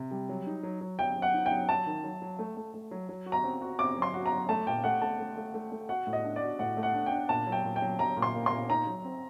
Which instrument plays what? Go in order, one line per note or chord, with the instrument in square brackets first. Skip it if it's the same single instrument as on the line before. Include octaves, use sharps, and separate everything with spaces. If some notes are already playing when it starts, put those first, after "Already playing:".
Already playing: [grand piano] C3
G3
F#3
D#4
F#3
F#3
[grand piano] F#3 [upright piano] G5
[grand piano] F#3
[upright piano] F#5
[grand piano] D#4
[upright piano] G5
[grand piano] F#3
[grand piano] F#3 [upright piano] A5
[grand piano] D#3
F#3
F#3
A3
A3
A3
F#3
F#3
F#4
[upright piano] A#5
[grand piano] C4
F#4
[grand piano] C4 [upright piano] D6
[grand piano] F#3
[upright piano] C6
[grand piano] F#4
[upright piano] A#5
[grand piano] F#3
[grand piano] A3 [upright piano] A5
[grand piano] A#2 [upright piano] G5
[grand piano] A3 [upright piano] F#5
[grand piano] A3 [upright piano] A5
[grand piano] A3
A3
A3
A3
[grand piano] F#4 [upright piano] F#5
[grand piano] A2
[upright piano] D#5
[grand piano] D4
[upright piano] D5
[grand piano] F#4
[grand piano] A2 [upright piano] F#5
[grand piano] A3
[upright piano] F#5
[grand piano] D4
[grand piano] D4 [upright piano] G5
[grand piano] A#2 [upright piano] A5
[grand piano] F#3
[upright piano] G5
[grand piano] A#2
[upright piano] G5
[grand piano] F#3
[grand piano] F#3 [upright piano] A#5
[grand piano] A#2
[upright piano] C6
[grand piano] A#3
[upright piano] C6
[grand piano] A#2
[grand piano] D#4 [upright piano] A#5
[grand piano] F#3
C4